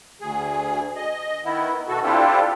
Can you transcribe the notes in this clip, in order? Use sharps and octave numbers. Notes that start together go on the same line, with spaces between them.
D2 G#4
D#5
D#3 B3 E4
B2 F#4 A4
C4 D4 E4 F4 G4 A4